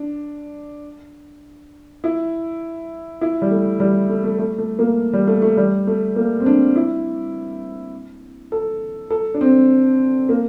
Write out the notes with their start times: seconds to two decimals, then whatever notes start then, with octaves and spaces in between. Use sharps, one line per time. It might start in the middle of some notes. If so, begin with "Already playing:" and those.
Already playing: D4
2.04 E4
3.21 E4
3.42 G3
3.51 A3
3.80 G3
4.10 A3
4.24 A3
4.38 A3
4.58 A3
4.79 A#3
5.13 G3
5.27 A3
5.42 A3
5.57 G3
5.87 A3
6.16 A#3
6.40 C4
6.46 D4
6.76 E4
8.52 A4
9.10 A4
9.34 D4
9.41 C4
10.29 A#3